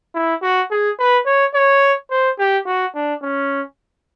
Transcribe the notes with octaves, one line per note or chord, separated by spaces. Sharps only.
E4
F#4
G#4
B4
C#5
C#5
C5
G4
F#4
D4
C#4